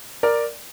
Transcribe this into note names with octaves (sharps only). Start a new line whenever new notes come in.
A#4 D5